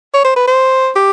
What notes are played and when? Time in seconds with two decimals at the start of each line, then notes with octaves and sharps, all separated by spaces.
0.14 C#5
0.24 C5
0.36 B4
0.47 C5
0.96 G4